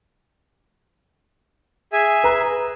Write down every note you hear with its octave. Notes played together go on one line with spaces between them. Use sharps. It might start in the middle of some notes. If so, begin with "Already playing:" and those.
G#4 E5 G#5
B4 A#5 F#6